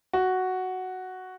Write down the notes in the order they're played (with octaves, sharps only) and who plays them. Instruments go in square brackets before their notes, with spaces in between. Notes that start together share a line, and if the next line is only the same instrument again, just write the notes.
[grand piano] F#4